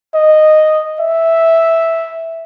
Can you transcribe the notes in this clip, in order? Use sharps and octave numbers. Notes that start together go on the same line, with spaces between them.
D#5
E5